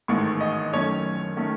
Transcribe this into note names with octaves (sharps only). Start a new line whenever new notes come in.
A1 G#2 D#3 A3 C#6
D#5
F#2 D#3 A3 C#4 C#5
D#3 A3 C#4